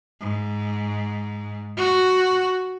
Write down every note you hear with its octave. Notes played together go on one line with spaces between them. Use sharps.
G#2
F#4